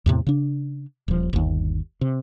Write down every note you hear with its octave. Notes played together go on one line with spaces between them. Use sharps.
E2 A2 C3
C#3 D4
D#1 F3
G1 D#2
C3